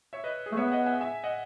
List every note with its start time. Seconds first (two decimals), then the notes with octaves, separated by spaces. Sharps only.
0.13 C#5 E5
0.24 B4 D#5
0.46 G#4
0.52 A3
0.57 B3 C#5 E5
0.72 D#5 F#5
0.86 E5 G#5
1.01 E5 G#5
1.24 D#5 F#5